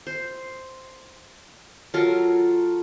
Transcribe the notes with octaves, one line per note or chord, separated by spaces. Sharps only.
C5
F#3 F4 A4 A#4